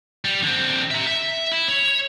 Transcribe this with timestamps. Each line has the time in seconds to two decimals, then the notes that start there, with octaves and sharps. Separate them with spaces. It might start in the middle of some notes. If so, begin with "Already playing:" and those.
0.25 G3
0.43 D3 C4
0.91 E5 A#5
1.07 E5
1.52 E4
1.68 C#5